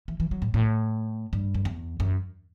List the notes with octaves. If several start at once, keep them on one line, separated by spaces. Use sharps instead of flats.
E3
E3
F#3
A2
A2
G2
F#2
E2
F#2